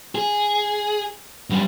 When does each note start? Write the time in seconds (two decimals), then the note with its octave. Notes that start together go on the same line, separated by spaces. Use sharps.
0.15 G#4
1.50 F#2 G3